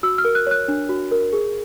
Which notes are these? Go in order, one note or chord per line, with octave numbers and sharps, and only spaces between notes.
F#4 E6
F6
A#4
F#6
C#5 F#6
D4
F#4
A#4
G#4